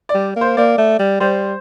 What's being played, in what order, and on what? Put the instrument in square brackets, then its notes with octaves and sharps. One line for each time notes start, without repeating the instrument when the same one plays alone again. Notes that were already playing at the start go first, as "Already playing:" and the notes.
[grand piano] D5
[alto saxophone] G3
A#3
[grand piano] C5
[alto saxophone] A#3 [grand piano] D5
[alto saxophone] A3
G3
[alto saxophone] G3 [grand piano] C5